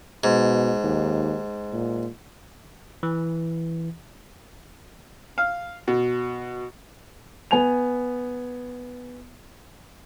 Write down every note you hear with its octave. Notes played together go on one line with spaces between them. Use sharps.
G#2 B2
D#2
A#2
E3
F5
B2
B3 G#5 F7